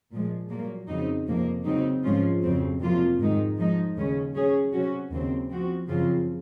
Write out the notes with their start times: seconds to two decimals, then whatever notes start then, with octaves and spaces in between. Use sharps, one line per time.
0.11 A#2 F3 G#3
0.50 A#2 F#3 A#3
0.88 F2 C#3 F#3 C4 D#4
1.27 F2 C3 F3 A#3
1.65 C#3 F#3 C4 D#4
2.03 G#2 F3 G#3 C#4 F4
2.42 F2 C#3 F#3 C4
2.80 F2 C3 F#3 A#3 F4
3.18 G#2 D#3 G#3 D#4
3.58 F3 G#3 D#4
3.96 D#2 C#3 G#3 C#4
4.34 F#3 C#4 G#4 C#5
4.73 C3 F#3 C#4 F#4
5.11 D#2 C#3 F#3 C4
5.49 F3 C4 F#4
5.88 F#2 C#3 F3 C4 F4